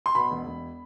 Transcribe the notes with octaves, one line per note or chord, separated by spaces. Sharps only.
C6
B2 B5
E1
E1